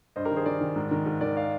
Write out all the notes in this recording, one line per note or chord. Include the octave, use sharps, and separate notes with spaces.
G2 C5 D#5
G4 A#4
D#3
G#4 C5
D#3 A#4 D5
D#3
G#2
D#3
G#2
D#3 A#4 D5
D5 F5